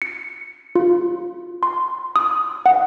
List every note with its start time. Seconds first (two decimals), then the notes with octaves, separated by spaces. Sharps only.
0.02 C#7
0.75 F4
1.63 C6
2.16 D#6
2.66 F#5